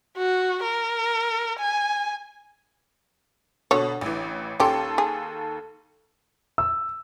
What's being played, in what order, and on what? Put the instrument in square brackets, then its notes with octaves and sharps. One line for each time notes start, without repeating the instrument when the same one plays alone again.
[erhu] F#4
A#4
G#5
[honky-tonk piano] B2 [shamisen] D3 C#5
[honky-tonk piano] A1 E3
[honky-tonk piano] D#2 A4 C6 [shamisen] C#4 G4
[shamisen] G#4
[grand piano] E6